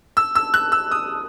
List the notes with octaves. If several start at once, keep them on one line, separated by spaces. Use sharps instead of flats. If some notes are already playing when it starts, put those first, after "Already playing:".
E6
E6
F#6
E6
D#6